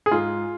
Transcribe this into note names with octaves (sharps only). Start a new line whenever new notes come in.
G#4
G#2 F4